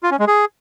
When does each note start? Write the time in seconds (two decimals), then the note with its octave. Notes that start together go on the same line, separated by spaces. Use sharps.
0.03 F4
0.11 C#4
0.19 G#3
0.27 G#4